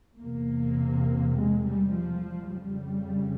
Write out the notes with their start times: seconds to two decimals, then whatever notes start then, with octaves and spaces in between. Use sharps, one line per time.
0.19 E2 C3 A#3
1.35 G#3
1.64 G3
1.93 F3
2.51 F2 C#3 G3